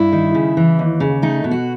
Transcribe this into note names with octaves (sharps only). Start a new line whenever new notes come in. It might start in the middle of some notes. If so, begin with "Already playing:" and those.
Already playing: G2 E4
D#3
C#3
E3
D#2
C#3
A3 D#4
B2
F#4